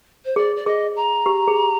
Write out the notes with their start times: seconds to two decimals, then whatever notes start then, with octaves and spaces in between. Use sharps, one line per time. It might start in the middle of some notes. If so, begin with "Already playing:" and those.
0.25 C5
0.36 G#4 D5
0.56 D5
0.66 G#4 D#5
0.96 A#5
1.26 G4
1.48 G#4